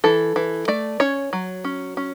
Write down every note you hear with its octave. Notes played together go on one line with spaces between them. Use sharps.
E3 A4
E3
A3 D5
C#4 C#5
F#3
C#4
C#4